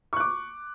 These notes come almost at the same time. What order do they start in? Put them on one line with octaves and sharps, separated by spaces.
C#6 F#6 D6